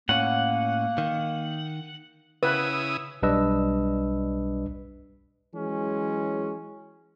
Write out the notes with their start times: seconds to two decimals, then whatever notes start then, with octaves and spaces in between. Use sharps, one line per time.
0.09 A2 A#3 C#4 F#5
0.98 D#3
2.43 C#3 E4 B4 D#6
3.22 B1 G3 D4 B4 D#5 E6
5.54 E3 F#3 G#3 C#4